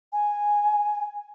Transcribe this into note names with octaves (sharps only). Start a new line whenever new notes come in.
G#5